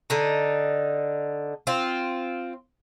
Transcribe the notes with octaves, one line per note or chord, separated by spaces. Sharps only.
D3 D#4
C4 F4